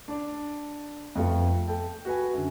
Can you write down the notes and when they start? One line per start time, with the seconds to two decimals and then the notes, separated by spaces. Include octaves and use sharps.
0.08 D4 D5
1.15 F2 A3 B3 F4
1.68 A4 G5
2.05 F#4 B4 G#5
2.33 F#2 D3